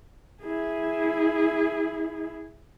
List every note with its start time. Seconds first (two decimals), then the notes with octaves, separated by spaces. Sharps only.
0.43 E4 G#4